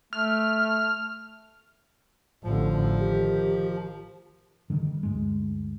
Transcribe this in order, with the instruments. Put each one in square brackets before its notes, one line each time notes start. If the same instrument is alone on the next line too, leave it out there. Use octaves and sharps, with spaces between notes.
[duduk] A3 [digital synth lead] F6
[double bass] A1 D3 [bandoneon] F3
[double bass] D#3 [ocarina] G4
[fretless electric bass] D3 D#3 G3
D2 G2 G#3